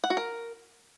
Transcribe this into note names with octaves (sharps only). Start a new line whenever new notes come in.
F#5
F#4
A#4